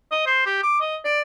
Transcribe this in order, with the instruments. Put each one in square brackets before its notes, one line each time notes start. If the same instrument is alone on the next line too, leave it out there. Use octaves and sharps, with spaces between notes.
[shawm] D#5
C5
G4
D6
D#5
D5